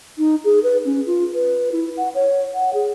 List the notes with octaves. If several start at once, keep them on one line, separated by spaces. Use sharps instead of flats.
D#4
G#4
B4
C#4
F4
B4
E4
F#5
C#5
F#5
G#4